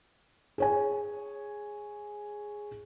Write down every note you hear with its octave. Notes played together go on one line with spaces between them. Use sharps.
G#4 C#5 G#5